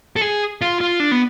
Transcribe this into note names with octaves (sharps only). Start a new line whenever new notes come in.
A4
G#4
F4
F4
D4
B3